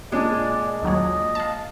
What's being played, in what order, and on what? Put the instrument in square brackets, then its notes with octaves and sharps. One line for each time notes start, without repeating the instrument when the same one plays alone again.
[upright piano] A#2 D4 [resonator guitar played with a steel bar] G#3 [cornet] D5
[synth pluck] D#2 F#3 C#5 [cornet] D#5
[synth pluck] F5 A5